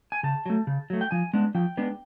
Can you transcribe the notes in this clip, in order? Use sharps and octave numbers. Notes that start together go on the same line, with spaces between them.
G#5
C#3 A5
F#3 A3
C#3
F#3 A3
G5
F3 G#5
G#3 B3 D4
F3 G5
G#3 B3 D4